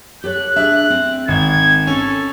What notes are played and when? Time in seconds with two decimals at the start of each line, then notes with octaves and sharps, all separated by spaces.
0.24 G4 A4 C#5 F#6
0.56 D4 G#4 E5
0.90 C4
1.28 G#1 G#6
1.87 C#4 A4